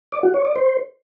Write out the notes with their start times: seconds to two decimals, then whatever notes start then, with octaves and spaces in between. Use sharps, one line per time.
0.12 D5
0.23 F#4
0.34 C#5
0.45 D5
0.56 C5